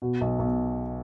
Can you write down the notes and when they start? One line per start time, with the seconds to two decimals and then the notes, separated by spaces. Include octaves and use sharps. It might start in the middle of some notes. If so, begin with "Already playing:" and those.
0.02 B2
0.21 B1
0.39 B1